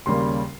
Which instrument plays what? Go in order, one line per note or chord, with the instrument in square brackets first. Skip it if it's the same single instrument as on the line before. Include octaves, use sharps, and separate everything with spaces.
[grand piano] D#2 C#3 G3 A#3 C6